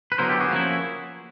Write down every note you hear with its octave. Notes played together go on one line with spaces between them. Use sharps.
B4
D3 F#3 B3 E4 A#4 C5
G4 A4
F#4 G#4
F3 A#3 C#4 E4